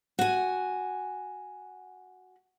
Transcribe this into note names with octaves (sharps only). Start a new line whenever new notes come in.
F#4 G#5